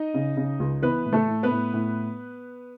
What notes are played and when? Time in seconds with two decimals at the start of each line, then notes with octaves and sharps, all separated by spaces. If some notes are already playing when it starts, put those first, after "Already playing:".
Already playing: D#4 D#5
0.14 C#3
0.37 C#3
0.60 C#2
0.82 E3 B3 B4
1.05 A2
1.13 A3 A4
1.28 A2
1.43 B3 B4
1.51 A2
1.74 A2